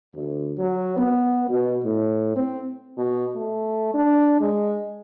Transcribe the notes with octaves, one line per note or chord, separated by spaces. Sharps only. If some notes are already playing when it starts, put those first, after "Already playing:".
D2
F#3
B3
B2
A2
C4
B2
A3
D4
G#3